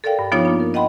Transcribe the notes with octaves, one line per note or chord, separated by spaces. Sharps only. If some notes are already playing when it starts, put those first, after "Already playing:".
A4 A#4 D5 F5 G5
G2
F3 B3 D4 D#4 F4 C#5
A#3 D4
A#4
D#5 F#5 G5 B5 C6